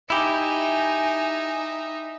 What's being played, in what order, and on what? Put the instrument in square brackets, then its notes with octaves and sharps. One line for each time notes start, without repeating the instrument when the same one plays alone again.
[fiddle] D#4 E5 [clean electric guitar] E4 G4 [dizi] G#5